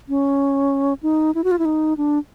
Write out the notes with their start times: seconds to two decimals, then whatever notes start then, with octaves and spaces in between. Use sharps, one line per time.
0.09 C#4
1.03 D#4
1.35 E4
1.44 F#4
1.51 F4
1.59 E4
1.65 D#4
1.97 D4